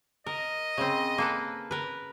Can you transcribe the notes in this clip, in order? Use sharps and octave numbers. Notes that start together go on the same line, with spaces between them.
A#4 D#5
C#3 C4
A#3 A4 B4
A#4 B4